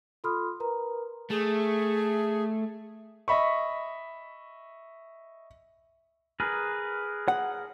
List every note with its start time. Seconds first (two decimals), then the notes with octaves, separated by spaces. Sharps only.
0.24 F4 A4 B5 C6 D#6 F6
0.60 A#4 B4 A#5
1.30 A3 G#4
3.28 D#5 E5 B5 C#6
6.40 G#4 A#4 B4
7.28 F#5